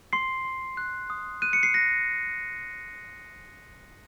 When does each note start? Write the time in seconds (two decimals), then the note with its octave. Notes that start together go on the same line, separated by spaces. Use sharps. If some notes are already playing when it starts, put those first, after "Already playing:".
0.13 C6 C7
0.45 C6
0.77 F#6
1.10 D#6
1.42 F#6 D#7
1.53 C#7
1.63 C7
1.74 F#6 A#6